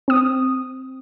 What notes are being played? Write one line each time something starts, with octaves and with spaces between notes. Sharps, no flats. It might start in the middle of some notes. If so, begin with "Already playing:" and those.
C4 D#6